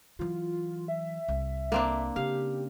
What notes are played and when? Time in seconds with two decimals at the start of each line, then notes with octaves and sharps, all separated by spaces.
0.19 E3 F#3 F4
0.88 E5
1.28 C2
1.72 A#3 C4 D4
2.16 C#3 G4 F5